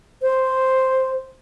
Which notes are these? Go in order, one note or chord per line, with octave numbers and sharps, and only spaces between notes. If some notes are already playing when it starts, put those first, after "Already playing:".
C5